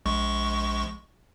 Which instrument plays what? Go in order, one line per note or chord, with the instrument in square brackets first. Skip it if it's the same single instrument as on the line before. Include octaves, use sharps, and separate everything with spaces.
[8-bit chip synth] A#1 G#3 C#6